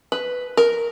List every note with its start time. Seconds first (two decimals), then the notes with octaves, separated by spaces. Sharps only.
0.12 B4
0.57 A#4